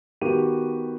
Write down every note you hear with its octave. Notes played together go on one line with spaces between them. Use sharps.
D#3 B3 F#4 G4 D#7